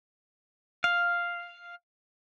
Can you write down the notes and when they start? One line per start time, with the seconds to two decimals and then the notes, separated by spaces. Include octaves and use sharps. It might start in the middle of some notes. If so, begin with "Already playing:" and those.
0.84 F5